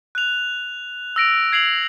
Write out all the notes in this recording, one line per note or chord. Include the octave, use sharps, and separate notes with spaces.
F#6 F7
E6 A#6 D7 F7
G#6 C7 F7 F#7